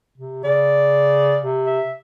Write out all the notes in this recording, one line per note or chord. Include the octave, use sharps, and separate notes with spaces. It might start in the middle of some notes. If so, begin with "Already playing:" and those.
C3
C#3 D5
C3
E5